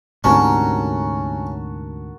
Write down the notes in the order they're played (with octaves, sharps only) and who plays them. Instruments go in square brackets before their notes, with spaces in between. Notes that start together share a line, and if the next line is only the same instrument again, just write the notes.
[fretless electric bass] D2 G#2 C3 [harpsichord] C#4 [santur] F#4 A5 [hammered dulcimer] A#4